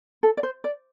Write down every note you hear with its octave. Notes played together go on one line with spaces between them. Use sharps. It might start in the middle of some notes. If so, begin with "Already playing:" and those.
A4
D5
C5
D5